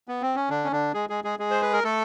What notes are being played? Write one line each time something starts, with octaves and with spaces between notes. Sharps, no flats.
B3
C4
C#4
D3 D4
C#4
D3 D4
G#3 G#4
G#3 G#4
G#3 G#4
G#3 G#4
C5
B4
A#4
A3 A4